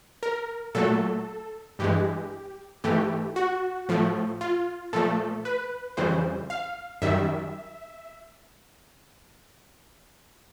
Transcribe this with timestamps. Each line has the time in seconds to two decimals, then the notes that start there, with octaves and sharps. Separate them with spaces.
0.23 A#4
0.75 A#2 F#3 A3 A4
1.79 G2 E3 G#3 G4
2.84 G#2 E3 A3 G4
3.36 F#4
3.89 A2 F3 A3
4.41 F4
4.93 A#2 F3 A3 A4
5.45 B4
5.97 F2 C#3 E3 G3 C5
6.50 F5
7.02 F#2 D#3 G3 E5